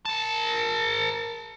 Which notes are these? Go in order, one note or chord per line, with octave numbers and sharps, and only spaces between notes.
A#4 A5